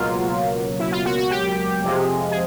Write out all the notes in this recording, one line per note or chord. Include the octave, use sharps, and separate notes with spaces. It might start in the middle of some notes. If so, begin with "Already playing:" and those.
Already playing: C#2 B2 F#3 A#3 F4
E4
F4
F#4
F#4
G4
F2 C3 F3 G#3
G#4